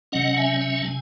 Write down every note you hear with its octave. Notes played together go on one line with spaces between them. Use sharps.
C3 F#3 C#4 D#5 F#5
E5 G#5
E5 G#5
A5
C3 G#5